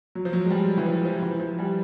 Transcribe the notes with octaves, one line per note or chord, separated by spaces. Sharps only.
F#3
F3
F#3
G#3
G3
E3
F3
F3
E3
F3
G3